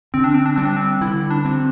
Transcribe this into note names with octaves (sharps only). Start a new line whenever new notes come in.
D3 C4
D4
C4
D4
G3 C4
D4
C4
D3 E4
D4
C4